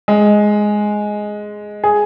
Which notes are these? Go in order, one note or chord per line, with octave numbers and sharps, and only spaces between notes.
G#3
G#4